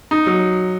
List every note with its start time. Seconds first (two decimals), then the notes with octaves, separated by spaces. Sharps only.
0.11 D#4
0.27 F#3